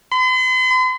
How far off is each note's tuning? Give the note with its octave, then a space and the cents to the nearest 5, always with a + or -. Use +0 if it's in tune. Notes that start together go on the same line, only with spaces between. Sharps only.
C6 -45